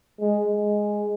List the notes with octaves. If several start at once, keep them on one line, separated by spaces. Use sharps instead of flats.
G#3
G#3